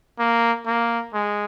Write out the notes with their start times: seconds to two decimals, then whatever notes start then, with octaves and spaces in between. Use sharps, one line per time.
0.19 A#3
0.66 A#3
1.13 G#3